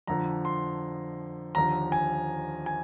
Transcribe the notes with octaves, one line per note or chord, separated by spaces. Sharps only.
F2 D3 F3 A#5
C6
D#2 D3 F3 A#5
G#5
G#5